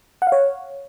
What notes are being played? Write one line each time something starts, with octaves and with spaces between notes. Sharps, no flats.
F#5
F5
C#5